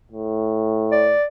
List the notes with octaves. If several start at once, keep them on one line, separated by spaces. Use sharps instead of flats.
A2
D5